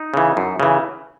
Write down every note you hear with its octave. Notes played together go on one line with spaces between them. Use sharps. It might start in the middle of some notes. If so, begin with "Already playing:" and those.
Already playing: D#4
C#3 E3
F#2
C#3 E3